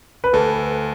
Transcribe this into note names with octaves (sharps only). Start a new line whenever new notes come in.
B4
D2 A4